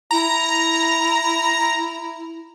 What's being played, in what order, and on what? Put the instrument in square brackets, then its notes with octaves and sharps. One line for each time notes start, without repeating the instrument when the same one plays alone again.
[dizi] E4 [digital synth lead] A#5